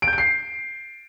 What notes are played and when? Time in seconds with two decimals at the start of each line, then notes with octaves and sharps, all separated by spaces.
0.02 D7
0.07 G6
0.13 D7
0.18 C7